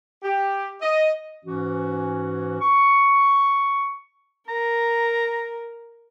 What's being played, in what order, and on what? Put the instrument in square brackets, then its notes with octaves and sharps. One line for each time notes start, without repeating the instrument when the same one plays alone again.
[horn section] G4
D#5
[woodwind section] G#2 E3 C#4 F#4
C#6
[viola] A#4 [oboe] A#5